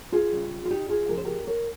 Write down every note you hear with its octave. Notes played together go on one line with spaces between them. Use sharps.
F4 G#4
C#3 G3
F4
D#4 G4
F4 G#4
C#3 F3 G#3 A#4
C5
G4 A#4
A#4 C#5